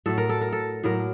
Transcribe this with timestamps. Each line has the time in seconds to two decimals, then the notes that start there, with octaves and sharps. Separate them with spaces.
0.06 A2 F#3 A3 A4
0.18 A#4
0.29 A4
0.41 A#4
0.53 A4
0.83 A2 F#3 A#3 A#4